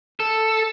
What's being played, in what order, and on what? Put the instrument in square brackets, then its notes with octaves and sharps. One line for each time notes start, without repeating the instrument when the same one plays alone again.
[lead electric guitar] A4